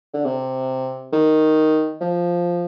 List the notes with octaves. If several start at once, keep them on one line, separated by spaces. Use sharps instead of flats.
D3
C3
D#3
F3